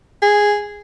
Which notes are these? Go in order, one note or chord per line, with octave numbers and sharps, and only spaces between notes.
G#4